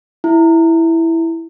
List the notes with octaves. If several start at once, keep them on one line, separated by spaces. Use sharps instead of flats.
E4